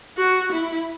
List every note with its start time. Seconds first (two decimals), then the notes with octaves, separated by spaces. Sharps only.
0.17 F#4
0.51 E4